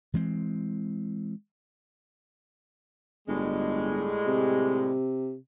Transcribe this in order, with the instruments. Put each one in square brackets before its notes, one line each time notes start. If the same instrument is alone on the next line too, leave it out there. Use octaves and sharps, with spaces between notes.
[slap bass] E3 G#3 C4
[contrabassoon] G1 [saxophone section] A2 G3 G#3
[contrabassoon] C3